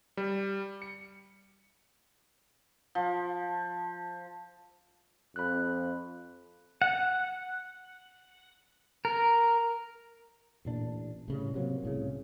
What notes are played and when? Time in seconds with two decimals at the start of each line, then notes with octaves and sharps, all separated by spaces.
0.17 G3
0.82 C#7
2.95 F3
5.36 F2 B5 F#6
6.82 F#5
9.05 A#4
10.65 A1 A#2 D4
11.28 A2 C#3 G3
11.54 C3 F#3 A#3
11.83 C2 A2 C#3